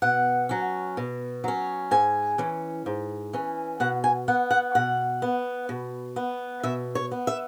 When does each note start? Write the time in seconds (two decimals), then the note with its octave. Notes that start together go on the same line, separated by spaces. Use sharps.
0.02 B2 F#5
0.49 F#3 C#4
0.97 B2
1.44 F#3 C#4
1.91 G#2 G#5
2.38 E3 C#4
2.86 G#2
3.33 E3 C#4
3.80 B2 F#5
4.04 G#5
4.28 B3 F#5
4.50 F#5
4.75 B2 F#5
5.22 B3
5.69 B2
6.16 B3
6.63 B2 E5
6.95 C#5
7.11 B3
7.27 E5